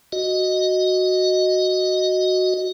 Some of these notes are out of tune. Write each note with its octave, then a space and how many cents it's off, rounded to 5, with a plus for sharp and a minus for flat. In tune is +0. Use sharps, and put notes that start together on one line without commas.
F#4 +0 D#5 +0